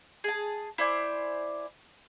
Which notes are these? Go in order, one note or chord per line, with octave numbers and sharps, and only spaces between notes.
G#4 A5
E4 C5 D5 G#5